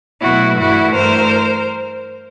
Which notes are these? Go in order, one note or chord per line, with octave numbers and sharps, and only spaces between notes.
B2 F#3 A3 E4 F#4
G2 E3 A3 E4 F#4
G2 E3 A3 A#4 C5